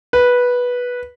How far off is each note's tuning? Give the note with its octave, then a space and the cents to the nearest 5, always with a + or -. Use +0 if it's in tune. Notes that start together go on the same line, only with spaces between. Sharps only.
B4 -10